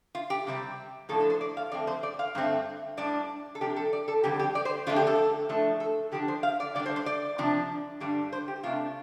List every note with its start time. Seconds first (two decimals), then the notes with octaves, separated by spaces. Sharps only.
0.15 F4
0.30 G4
0.47 C3 G3 C4
1.09 A2 F3 D4 A4
1.20 A4
1.30 C5
1.41 D5
1.57 F5
1.72 F2 D3 A3 C4 D5
1.87 C5
2.03 D5
2.19 F5
2.35 G2 D3 A3 C4
2.97 A2 G3 D4 D5
3.55 A4
3.61 C3 F3 D4 G4
3.76 A4
3.93 D5
4.08 A4
4.24 F2 D3 G3 C4 G4
4.39 G4
4.55 D5
4.65 C5
4.87 F2 D3 A3 D4 F4
4.96 G4
5.07 A4
5.49 A2 F3 A3 D4
5.80 A4
6.12 D3 F3 D4 G4
6.28 C5
6.43 F5
6.60 D5
6.75 D3 G3 D4 D5
6.86 C5
6.96 C5
7.06 D5
7.38 C3 F3 D4
8.01 G2 D3 G3 D4
8.32 C5
8.48 G4
8.63 C3 A3 D4 F4